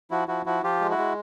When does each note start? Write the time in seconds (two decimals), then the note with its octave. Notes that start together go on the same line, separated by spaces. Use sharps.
0.11 F3 E4 F#4
0.28 F3 E4 F#4
0.46 F3 E4 F#4
0.63 F3 F4 G4
0.81 G#3
0.90 E4 F#4
0.98 G#3